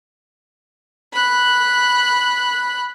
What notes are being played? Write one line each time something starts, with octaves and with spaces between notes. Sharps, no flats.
B5 F#6